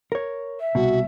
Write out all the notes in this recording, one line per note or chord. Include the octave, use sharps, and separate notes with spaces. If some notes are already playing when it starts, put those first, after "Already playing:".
A#4 C#5
E5
C2 B2 F#4